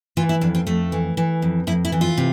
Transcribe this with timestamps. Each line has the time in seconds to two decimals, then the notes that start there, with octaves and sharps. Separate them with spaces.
0.17 E3 F4
0.29 E4
0.41 F2 D4
0.55 C4
0.67 F2 A3
0.92 E3
1.17 E3
1.42 F2
1.67 F2 E4
1.85 E4
1.92 E3
2.01 F4
2.17 C3